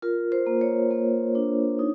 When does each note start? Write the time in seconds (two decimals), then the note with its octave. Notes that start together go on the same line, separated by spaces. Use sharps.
0.02 F4 A#4
0.32 C5
0.46 A#3
0.61 C#5
0.91 A#3
1.35 D4
1.79 D#4